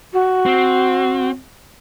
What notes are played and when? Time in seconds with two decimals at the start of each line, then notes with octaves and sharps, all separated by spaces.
0.13 F#4
0.46 C4